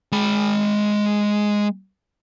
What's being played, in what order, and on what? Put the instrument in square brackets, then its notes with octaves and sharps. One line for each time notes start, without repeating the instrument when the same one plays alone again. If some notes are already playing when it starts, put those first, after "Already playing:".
[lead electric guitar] G#3 B5